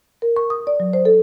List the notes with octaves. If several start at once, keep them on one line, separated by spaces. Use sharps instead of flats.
A#4
C#6
D#6
D5
F#3
C5
A4